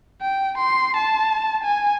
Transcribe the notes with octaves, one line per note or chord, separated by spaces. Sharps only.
G5
C6
A5
G#5